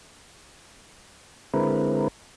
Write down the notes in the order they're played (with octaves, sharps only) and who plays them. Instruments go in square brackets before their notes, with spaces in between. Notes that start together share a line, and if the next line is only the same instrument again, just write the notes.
[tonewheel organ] D3 G#3 C4 E4 A#4 B4